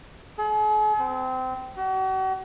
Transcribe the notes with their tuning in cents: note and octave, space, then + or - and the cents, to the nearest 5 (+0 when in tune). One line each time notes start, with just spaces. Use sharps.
G#4 +45
C4 -25
F#4 +40